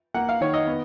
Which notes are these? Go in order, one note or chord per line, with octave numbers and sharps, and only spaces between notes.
A#3 F#5
F5
D#3 C#5
D#5
B3